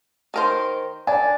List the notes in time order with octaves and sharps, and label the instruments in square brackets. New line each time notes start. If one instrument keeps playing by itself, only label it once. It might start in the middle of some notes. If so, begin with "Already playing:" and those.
[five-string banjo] D#3 A#4 C5
[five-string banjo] D4 [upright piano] D5 G#5